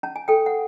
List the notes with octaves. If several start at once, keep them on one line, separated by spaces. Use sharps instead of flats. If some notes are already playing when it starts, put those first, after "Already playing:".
C#4 A5
G#5
A4 G5
F#5